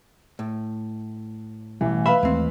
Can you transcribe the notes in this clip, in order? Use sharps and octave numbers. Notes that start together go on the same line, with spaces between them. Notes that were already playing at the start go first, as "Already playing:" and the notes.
A2
A1 B2 E3 G3
B4 E5 F5 B5
D#2 E3 G#3 A3 C4